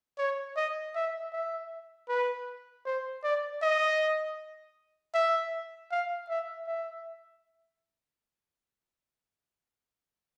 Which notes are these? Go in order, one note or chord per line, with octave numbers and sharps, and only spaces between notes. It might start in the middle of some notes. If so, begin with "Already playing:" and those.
C#5
D#5
E5
E5
B4
C5
D5
D#5
E5
F5
E5
E5